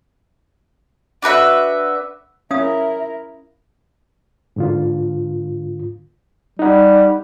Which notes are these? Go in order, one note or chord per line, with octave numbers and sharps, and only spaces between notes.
D4 F#4 B4 E5
C#4 E4 A#4 E5 F5 D#6
G#2 D3 F4
G3 D#4 F#5